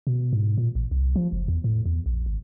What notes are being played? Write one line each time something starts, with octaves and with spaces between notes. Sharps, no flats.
B2
G#2
A#2
A1
C2
F3
F#1
E2
A2
E2
A#1
G#1